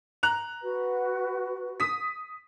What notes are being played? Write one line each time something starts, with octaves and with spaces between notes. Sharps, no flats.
A#5 F#6 F7
F#4 B4
D#6 B6